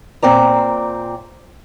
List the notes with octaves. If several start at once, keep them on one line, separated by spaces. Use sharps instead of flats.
A#2 C4 D5 A#5